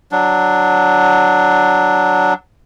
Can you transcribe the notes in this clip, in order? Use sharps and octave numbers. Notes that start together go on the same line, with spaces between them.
F#3 D4